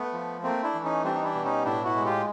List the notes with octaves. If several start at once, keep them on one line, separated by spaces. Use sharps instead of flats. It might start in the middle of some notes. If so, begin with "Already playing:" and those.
Already playing: A3 B3
F3
A3 A#3 C4
D4 E4
E3
C#4 D#4
G3 C4 D4
D#4
D4 E4
B2
C#4 D#4
A2 D4 E4
E4 F#4
G#3
F4 G4